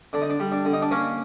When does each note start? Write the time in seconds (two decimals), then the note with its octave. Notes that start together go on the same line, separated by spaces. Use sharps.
0.13 D3 D4
0.22 D#4
0.30 D4
0.40 G3
0.52 D4
0.65 D3
0.73 D#4
0.82 D4
0.91 A#3 C#4